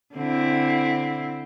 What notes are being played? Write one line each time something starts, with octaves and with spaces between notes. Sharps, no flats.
D3 C4 E4